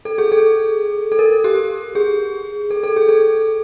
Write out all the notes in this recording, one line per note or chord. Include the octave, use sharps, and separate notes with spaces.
A4
G#4
A4
A4
A#4
G4
G#4
A4
A4
G#4
A4